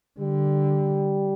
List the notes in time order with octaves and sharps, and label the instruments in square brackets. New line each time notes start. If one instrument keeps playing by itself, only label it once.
[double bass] D3 [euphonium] G3